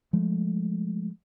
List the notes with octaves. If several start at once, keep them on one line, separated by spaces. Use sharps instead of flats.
F3 G#3 A3